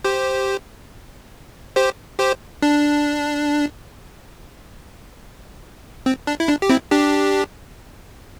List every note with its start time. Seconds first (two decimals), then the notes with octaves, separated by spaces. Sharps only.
0.04 G4 C5
1.76 G4 C5
2.19 G4 C5
2.62 D4
6.06 C4
6.27 D4
6.40 E4
6.48 D4
6.62 G4
6.70 C4 E4
6.91 D4 G4